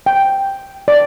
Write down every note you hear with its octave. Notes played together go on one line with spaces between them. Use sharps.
G5
D5